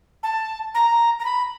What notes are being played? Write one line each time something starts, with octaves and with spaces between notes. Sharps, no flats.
A5
A#5
A#5
B5